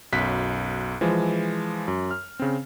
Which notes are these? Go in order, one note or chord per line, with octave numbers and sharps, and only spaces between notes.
B1 F#2 F#6 B6
E3 F3 G#3
F#2
F6
C#3 C4